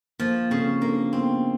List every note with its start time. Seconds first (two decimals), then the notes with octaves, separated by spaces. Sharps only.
0.20 F3 A#3
0.51 C#3 C4
0.82 A#3 D4
1.12 B3 C4